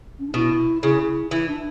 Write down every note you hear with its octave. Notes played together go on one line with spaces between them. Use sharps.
C#4
D4
B2 E4
C#3 E4
E3 E4
D4